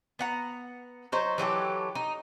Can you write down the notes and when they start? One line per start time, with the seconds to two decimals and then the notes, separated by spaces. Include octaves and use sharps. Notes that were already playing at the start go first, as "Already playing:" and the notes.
0.19 B3 F#5 A#5
1.12 F#3 D#4 C5
1.38 E3 F#3 G4 A4
1.95 D#4